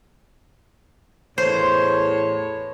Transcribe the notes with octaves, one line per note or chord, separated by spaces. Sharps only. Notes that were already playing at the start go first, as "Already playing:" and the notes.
E2 A2 C5 C#5